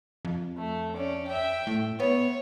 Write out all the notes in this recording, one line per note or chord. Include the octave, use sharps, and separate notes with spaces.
F2
A3
C#4 D5
E5 G5
A2
B3 C#5